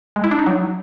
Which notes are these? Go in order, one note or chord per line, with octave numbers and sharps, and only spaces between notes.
G#3
E4
D4
D#4
F#3